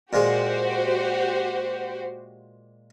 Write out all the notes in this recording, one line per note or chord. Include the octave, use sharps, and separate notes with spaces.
A#2 G#3 F#4 G4 C5